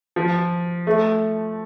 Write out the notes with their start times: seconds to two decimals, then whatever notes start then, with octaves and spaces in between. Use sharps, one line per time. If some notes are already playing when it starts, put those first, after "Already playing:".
0.16 F3
0.87 A3